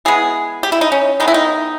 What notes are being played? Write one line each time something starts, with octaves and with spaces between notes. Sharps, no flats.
E3 G#3 B3 G#4
G4
E4
D#4
C#4
D#3 G#3 B3 D#4
E4
D#4